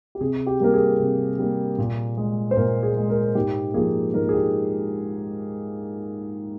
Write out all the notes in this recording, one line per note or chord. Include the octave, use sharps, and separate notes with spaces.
G4
C3 G#4
G4
G3 A#3 A#4
G#4
C3
G3 A#3
A#2
G#3
C5
A#2 A#4
G#4
G#3
A#4
G#2 G4
F3 A#3 G#4
G#2 A#4
G#4
G4